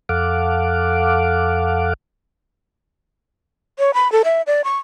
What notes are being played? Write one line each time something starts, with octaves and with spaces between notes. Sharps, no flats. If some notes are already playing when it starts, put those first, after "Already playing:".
F2 A4 F5 F#5 D6
C#5
B5
A4
E5
D5
C#6